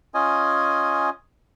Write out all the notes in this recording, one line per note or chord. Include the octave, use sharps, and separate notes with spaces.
C#4 F4 D#5 G#5